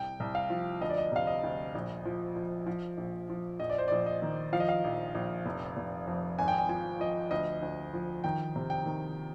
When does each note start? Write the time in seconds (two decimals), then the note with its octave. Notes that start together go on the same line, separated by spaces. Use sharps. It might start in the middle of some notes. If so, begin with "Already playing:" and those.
Already playing: C2 G5
0.20 C2
0.35 F5
0.50 F3
0.81 D2 D#5
0.90 D5
0.98 D#5
1.12 C3 F5
1.27 D#5
1.44 D2
1.75 A#1
2.05 F3
2.36 F3
2.66 F3
2.97 A#1
3.30 F3
3.60 A#1 D#5
3.70 D5
3.78 C5
3.88 A#1 D5
4.06 D#5
4.22 D#3
4.53 F3 F5
4.60 D#5
4.69 F5
4.84 A#1
5.15 A#1
5.46 F1
5.77 F1
6.07 F2
6.39 G#1 G#5
6.48 G5
6.58 G#5
6.69 F3 G#5
7.00 F3 D#5
7.31 D2 D#5
7.62 D2
7.93 F3
8.24 D#3 G5
8.56 C3
8.70 G5
8.86 D#3